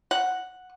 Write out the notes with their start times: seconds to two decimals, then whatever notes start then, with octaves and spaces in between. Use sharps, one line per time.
0.11 F#5